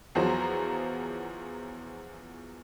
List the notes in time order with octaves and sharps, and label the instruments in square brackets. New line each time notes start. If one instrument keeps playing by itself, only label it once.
[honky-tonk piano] E2 F3 F#3 C5 A#5